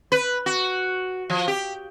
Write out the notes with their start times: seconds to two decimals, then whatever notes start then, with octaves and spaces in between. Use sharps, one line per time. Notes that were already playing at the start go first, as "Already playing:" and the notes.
0.12 B4
0.46 F#4
1.30 F3
1.48 G4